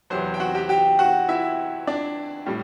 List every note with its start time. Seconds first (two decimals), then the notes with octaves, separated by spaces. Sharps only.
0.10 E2 C3 F#3 C5
0.34 G5
0.40 F#4 F#5
0.55 G4 G5
0.69 G4 G5
0.99 F#4 F#5
1.29 E4 E5
1.87 D4 D5
2.46 A2 G3